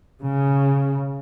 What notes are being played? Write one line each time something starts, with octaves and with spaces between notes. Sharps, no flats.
C#3